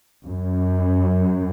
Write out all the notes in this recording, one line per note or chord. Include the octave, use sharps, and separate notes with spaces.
F#2